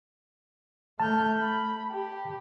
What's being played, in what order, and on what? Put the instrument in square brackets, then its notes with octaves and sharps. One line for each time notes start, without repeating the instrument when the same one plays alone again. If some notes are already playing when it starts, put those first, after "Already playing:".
[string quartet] A3 F6 G6 [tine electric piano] A5
[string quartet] B5
G4